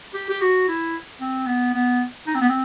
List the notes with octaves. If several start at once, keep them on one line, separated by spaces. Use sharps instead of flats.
G4
G4
F#4
E4
C4
B3
B3
D#4
C4
B3
C4